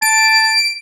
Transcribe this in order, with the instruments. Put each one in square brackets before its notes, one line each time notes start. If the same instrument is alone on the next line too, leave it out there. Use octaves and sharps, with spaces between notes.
[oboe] A5 [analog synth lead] D7